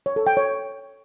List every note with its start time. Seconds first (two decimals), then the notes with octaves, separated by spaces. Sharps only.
0.06 C#5
0.16 A4
0.27 G5
0.37 C#5